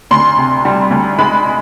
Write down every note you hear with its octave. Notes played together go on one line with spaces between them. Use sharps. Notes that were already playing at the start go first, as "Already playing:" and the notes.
D2 C6
C3
G3
D2
G#3 B5